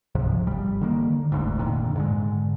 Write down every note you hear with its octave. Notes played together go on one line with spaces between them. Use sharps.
C#2 G#2 C3 F3
G1 G3
D3 D#3 A#3
F1 D2 G#2
F2 A#2 D3 D#3
G#2 D3 G#3